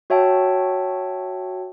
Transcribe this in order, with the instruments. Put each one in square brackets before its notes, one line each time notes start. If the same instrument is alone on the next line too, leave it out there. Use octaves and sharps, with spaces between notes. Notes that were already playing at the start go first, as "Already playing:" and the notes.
[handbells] F#4 C#5 E5 G5 A5